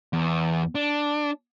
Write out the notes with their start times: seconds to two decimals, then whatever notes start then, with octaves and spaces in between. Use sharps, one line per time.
0.13 E2
0.75 D4